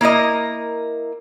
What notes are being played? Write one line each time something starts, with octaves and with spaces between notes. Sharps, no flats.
A#3 E4 A#4 D#5